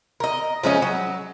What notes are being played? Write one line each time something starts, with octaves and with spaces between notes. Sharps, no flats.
A#4 D#5
F3 G#3 C#4 D#4
F#3